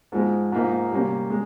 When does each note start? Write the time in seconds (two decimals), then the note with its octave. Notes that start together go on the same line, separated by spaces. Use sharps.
0.12 G#2 F3 G#3
0.52 G#2 F3 A#3 D#4
0.91 C3 G3 A#3 C#4
1.30 G#3